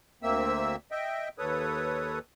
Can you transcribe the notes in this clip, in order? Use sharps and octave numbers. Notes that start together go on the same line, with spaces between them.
D2 A#3 C4 E5 E6
D#5 E5 G5
D#2 A4 B4 C#5 D#6